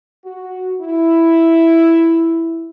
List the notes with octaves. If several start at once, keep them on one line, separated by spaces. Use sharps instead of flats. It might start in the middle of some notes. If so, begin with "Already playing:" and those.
F#4
E4